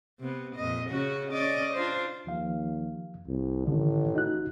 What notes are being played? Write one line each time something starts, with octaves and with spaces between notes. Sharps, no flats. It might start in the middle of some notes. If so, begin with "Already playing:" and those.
C3 B3
F2 A#2 D#5
C#3 C#4 F#4
C#4 D5 D#5
D4 F4 C5
D#2 F3 F5
C2
A1 G#2 D3 D#3
D#4 F#4 F#6